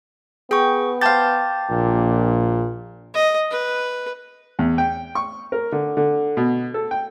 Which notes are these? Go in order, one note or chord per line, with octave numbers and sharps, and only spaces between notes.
B3 G#4 G5 C#6
G4 C5 F5 A5 G6 A6
A#1 A#2
D#5
B4
E2
G5
C#6
A#4
D3
D3
B2
A4
G5